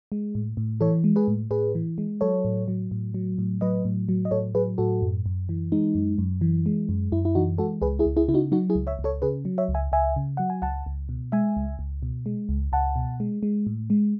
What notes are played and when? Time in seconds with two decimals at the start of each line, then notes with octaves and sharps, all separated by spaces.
0.12 G#3
0.35 A2
0.57 A2
0.81 E3 A4 C#5
1.04 G#3
1.16 G#4 B4
1.28 A2
1.51 A2 G#4 B4
1.75 E3
1.98 G#3
2.21 F#3 A4 C#5
2.45 A2
2.68 F#3
2.91 A2
3.14 F#3
3.38 A2
3.61 F#3 B4 D#5
3.85 A2
4.09 F#3
4.25 D#5
4.31 A2 A4 C#5
4.55 F#3 G#4 B4
4.78 A2 F#4 A4
5.02 F#2
5.26 F#2
5.49 E3
5.72 G#3 D#4
5.95 F#2
6.18 F#2
6.41 E3
6.66 G#3
6.89 F#2
7.12 F#2 E4
7.25 E4
7.35 E3 D#4 F#4
7.58 G#3 F#4 A4
7.82 C#2 G#4 B4
7.99 E4 G#4
8.05 C#2
8.17 E4 G#4
8.28 C#3 E4
8.34 D#4 F#4
8.52 F#3 D#4 F#4
8.70 E4 G#4
8.75 C#2
8.87 C#5 E5
8.99 C#2
9.04 A4 C#5
9.22 C#3 G#4 B4
9.45 F#3
9.58 C#5 E5
9.68 C#2
9.75 E5 G#5
9.92 C#2 E5 G#5
10.16 C#3
10.37 F#3 F#5
10.50 G#5
10.62 C#2 F#5 A5
10.86 C#2
11.09 B2
11.32 G#3 E5 G#5
11.57 C#2
11.79 C#2
12.03 B2
12.26 G#3
12.49 C#2
12.72 C#2 F#5 A5
12.96 B2
13.20 G#3
13.43 G#3
13.67 A2
13.90 G#3